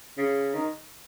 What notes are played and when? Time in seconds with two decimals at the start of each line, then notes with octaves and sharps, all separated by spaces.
0.18 C#3
0.54 D#3